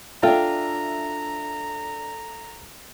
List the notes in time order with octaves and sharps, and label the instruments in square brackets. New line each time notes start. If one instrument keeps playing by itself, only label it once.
[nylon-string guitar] D4 G5 [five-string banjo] F4 [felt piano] A4 E5 [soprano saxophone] A#5